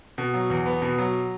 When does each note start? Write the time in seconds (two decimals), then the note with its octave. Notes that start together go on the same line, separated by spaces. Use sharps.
0.18 B2
0.34 F#3
0.50 E2
0.66 B3
0.82 B2
0.98 F#3